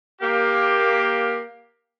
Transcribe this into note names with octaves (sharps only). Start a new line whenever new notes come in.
A#3 G4